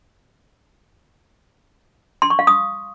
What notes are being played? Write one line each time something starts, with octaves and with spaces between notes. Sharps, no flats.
C6
C#6
F5
D#6